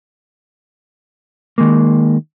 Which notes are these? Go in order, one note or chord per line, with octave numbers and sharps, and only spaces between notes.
D#3 G#3 A#3